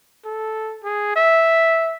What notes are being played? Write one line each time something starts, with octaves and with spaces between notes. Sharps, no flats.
A4
G#4
E5